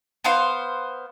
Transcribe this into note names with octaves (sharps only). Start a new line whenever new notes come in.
B3 C5 F5